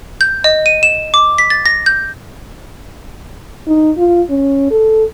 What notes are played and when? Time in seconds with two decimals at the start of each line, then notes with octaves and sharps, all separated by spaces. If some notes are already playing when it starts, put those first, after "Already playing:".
0.21 G6
0.44 D#5
0.66 D#7
0.83 E7
1.14 D6
1.38 B6
1.50 A6
1.66 A#6
1.86 G6
3.67 D#4
3.98 F4
4.29 C#4
4.70 A4